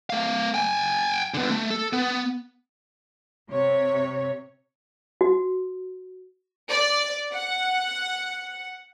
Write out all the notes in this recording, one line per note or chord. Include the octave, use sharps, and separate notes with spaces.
A3 F5
G5 G#5
D3 B3
A3
A4
B3
C3 C#5
F#4
D5
F#5